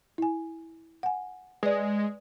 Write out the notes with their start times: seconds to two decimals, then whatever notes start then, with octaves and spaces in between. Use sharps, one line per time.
0.18 E4 G#5
1.03 F#5 G#5
1.63 G#3 B4 D5